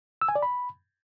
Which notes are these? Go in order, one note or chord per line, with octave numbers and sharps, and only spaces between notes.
E6
G#5
D5
B5